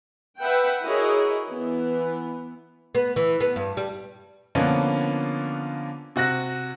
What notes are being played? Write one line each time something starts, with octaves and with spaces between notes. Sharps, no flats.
B4 E5 F#5 G5
E4 F#4 G#4 A#4 C#5 D#5
E3 B3
B3
E3
B3
G2
G3
D3 F3 A#3 B3 C#4 D4
C3 F#4 F#6 A#6